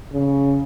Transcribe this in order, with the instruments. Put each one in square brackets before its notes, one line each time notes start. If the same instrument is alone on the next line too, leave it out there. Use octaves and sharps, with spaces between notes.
[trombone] C#3